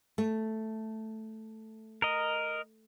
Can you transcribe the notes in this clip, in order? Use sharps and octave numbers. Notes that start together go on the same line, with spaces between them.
A3
A#4 D#5